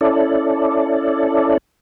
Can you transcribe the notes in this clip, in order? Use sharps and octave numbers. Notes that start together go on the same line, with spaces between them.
C#4 E4 A4 D5